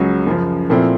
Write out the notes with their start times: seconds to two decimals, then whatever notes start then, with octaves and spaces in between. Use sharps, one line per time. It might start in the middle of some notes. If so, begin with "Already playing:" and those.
Already playing: C#2 C#3 F#3
0.27 F#2 C#3 F3
0.70 A#2 F3 A3 C4 E4